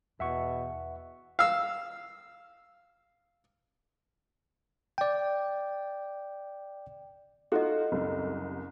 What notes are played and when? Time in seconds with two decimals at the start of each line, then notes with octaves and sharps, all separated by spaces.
0.20 E2 B2 E5 F#5 C#6
1.39 F5 E6
4.98 D5 G5
7.52 D#4 F4 F#4 A4 D#5
7.92 F#1 C2